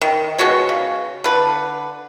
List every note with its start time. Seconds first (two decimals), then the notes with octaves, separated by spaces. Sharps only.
0.01 D#3
0.38 B2 G#3 F#4 C#5
0.69 C#3
1.24 D3 B4